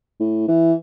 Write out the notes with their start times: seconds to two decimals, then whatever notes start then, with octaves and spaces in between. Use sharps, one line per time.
0.20 A2
0.48 E3